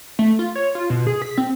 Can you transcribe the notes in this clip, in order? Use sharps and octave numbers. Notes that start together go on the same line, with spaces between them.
A3
F4
C#5
F4
B2
G#4
B6
C4